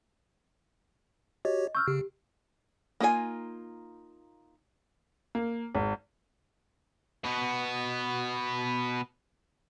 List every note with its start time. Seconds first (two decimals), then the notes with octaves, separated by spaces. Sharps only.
1.45 F#4 G4 C#5 D#5
1.75 C#6 E6 F6 G6
1.87 C#3 G4
3.00 A#3 D#4 F4 C5 G#5
5.35 A#3
5.75 G#1
7.24 B2 B3